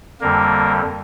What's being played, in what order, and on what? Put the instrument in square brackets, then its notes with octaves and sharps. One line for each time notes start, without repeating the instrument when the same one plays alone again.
[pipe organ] F2 D3 G3 A#3 A#4